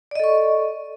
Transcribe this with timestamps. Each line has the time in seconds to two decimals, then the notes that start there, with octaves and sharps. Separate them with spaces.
0.11 D5
0.15 D#5
0.20 A4
0.24 C#6